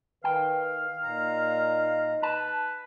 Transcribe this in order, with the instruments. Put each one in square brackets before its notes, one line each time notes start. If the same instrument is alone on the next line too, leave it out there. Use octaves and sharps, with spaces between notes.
[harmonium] D#3 [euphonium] B4 [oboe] F5 [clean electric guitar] G5
[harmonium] A#2 A#5 [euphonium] D#4
[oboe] B4 [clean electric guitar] A5